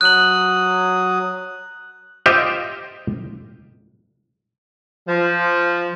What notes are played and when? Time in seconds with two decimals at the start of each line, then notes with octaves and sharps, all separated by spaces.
0.01 F#3 D#6 F#6 F#7
2.26 F4 G4 C5 D#5 E5
5.07 F3